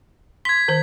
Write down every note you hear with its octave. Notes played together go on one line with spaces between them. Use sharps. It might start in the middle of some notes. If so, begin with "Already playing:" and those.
C6 G#6 B6
D#3 C5